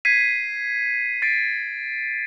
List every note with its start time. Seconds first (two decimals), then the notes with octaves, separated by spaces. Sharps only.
0.05 G#6 B6 C7 D#7
1.22 A6 B6 C7 D7